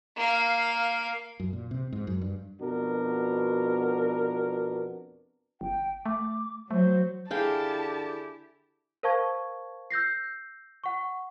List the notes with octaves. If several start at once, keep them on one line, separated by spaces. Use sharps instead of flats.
A#3 F5
F#2
A#2
C3
G#2
F#2
G2
F2 B2 B3 D4 F#4 A#4
G1 G5
A3 D6
F#3 A3 C5
D3 E4 G4 G#4 F5 G5 A5
A#4 C5 F5 A5 C#6 G#6
E6 G6 A#6 C7
F#5 C#6